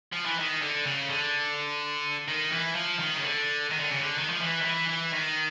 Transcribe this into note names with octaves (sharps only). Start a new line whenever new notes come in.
F3
E3
D#3
D3
C#3
D3
D#3
E3
F3
D#3
C#3
D3
D#3
D3
C#3
D3
D#3
F3
E3
D#3
E3
E3
D#3